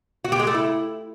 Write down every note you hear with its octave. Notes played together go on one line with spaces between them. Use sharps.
F#4
G4
G#3
A3
E4